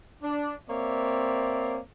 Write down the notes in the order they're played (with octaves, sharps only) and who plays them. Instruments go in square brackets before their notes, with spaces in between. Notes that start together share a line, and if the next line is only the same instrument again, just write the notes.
[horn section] D4
A#3 C4 C#5 D5 E5